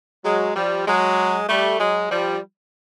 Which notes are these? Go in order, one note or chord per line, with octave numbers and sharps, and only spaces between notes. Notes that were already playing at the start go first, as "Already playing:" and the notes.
F#3 G#3
F3 G3
F#3 G#3
G3 A3
F#3 G#3
F3 G3